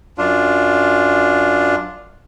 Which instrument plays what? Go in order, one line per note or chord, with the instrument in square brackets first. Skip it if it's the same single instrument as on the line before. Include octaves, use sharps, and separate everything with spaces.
[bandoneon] F#2 D4 F4